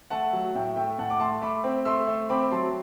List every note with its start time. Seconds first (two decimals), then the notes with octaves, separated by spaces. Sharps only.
0.10 A3 F#5 A5
0.33 F#3
0.55 A2 E5 G5
0.76 A3 E5 G5
0.98 A2 F#5 A5
1.10 D6
1.20 A3 A5 C6
1.42 A3 B5 D6
1.64 C4
1.85 A3 C6 E6
2.07 A3
2.29 C4 B5 D6
2.51 F#3 A5 C6